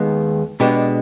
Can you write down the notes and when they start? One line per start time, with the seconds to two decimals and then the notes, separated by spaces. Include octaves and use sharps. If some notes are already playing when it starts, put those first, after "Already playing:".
Already playing: D#2 D#3 G#3 B3
0.60 B2 G#3 B3 D4 G4